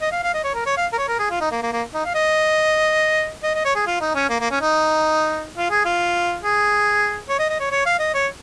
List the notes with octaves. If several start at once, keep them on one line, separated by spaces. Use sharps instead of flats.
D#5
F5
F5
D#5
C#5
A#4
C#5
F5
A#4
C#5
A#4
G#4
F4
D#4
A#3
A#3
A#3
D#4
F5
D#5
D#5
D#5
C#5
G#4
F4
D#4
C#4
A#3
A#3
C#4
D#4
F4
G#4
F4
G#4
C#5
D#5
D#5
C#5
C#5
F5
D#5
C#5